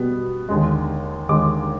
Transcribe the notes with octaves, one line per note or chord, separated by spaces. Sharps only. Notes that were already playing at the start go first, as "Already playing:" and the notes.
Already playing: B2 G3 B3
D#2 D3 G#3
D#2 D3 G#3 D6